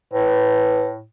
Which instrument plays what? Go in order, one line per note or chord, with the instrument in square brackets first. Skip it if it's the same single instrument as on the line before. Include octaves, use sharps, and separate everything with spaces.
[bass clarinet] A2 [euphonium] B4